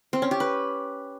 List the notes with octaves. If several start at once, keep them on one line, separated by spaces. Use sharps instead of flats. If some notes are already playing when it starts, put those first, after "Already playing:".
C4
C#4
G4
B4